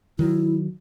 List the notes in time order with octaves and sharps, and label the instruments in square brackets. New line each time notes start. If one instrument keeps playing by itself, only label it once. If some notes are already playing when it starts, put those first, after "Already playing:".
[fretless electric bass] D#3 F#3 [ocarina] E4